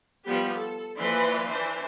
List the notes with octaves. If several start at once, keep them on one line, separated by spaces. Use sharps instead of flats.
F3 G3 B3 G4
A4
E3 F3 A#3 B4 D5 C6
E3 D4 C5